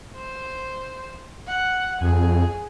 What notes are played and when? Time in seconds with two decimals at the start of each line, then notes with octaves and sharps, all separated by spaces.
0.16 C5
1.47 F#5
2.01 F2 G#4